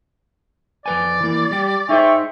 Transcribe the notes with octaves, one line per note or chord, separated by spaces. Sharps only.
F2 B4 D5 G#5
E3 A#3
G3 G4
D#4 G#4 C5 E5 G5 C#6